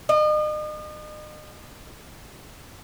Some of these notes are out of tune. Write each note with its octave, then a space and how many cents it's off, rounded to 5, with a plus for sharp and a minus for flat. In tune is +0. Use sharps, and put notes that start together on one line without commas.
D#5 -40